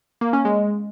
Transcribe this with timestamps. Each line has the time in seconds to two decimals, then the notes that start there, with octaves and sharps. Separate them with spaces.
0.21 A#3
0.33 C#4
0.45 G#3